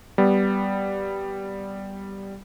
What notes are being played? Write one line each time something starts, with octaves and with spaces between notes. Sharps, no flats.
G3 B3